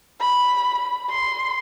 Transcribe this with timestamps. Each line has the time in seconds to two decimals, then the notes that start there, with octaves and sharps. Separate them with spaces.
0.20 B5
1.10 C6